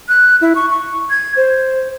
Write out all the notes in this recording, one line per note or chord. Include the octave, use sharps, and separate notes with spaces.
F#6
E4
C#6
C#6
G#6
C5